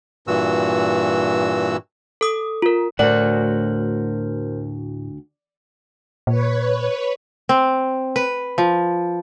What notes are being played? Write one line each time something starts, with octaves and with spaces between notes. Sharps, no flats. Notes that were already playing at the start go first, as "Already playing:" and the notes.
G2 A#2 E3 F#4 E6
A4 D#6
F4 A#4
D2 A2 F#4 A#4 C5 D5 F#5
A#2 B4 C#5
C4
B4
F3